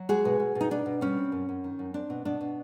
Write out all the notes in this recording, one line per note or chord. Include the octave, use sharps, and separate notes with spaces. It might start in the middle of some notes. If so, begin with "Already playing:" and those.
Already playing: F#3
G#3 F#4 G#4
B2
B2
B2
D#4
B2 D4
B2
G3 C#4
C4
F#2
F#2
D#3
F#2
C4 D4
B2
B2 D4
B2